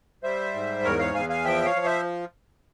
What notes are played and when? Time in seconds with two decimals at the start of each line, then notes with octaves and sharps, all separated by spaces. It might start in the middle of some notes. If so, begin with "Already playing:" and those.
0.23 G3 C5 E5
0.54 G#2
0.84 E2 A#4 C#5
0.99 C#5 F5
1.14 E2 F5 G#5
1.30 F5 G#5
1.45 F3 E5 G5
1.65 C#5 F5
1.76 F3
1.86 C5 E5